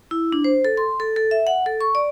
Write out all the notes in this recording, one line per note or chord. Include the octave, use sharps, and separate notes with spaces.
E4
D4
C5
A4
C6
A4
A4
E5
F#5
A4
C#6
D5